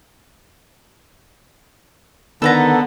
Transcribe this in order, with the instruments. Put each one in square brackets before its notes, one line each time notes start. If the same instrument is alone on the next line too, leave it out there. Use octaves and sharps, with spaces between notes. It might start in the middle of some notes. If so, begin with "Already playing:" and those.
[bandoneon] D3 [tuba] D#3 [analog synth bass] B3 [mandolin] A4 B4 A#5